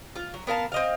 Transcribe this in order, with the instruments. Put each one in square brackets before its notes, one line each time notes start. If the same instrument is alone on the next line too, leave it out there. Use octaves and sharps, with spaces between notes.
[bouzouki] F4
F#3
B3 A#4 F5 A5
C4 D#5 F5